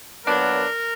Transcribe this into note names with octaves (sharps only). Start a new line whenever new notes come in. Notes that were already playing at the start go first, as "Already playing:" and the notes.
A#2 F#3 B3 D4 A#4